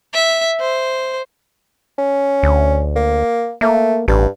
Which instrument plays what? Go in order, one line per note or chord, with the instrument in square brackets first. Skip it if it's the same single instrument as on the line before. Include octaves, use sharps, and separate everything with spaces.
[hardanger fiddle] E5
C5
[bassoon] C#4
[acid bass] D2
[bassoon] A#3
[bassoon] A3 [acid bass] A#3
[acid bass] A1 [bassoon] G2